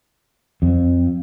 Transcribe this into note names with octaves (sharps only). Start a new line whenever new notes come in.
F2